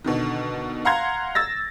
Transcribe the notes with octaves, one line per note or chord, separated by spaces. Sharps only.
B2 D3 D#3
F5 F#5 A#5 C6 G#6
E6 A6 A#6